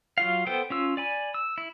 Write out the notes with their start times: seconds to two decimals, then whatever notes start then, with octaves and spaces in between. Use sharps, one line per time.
0.18 F#3 F4 F5
0.47 B3 A4 C5 G5
0.70 C#4 F4 E6
0.97 D5 G#5 B5
1.34 E6
1.58 E4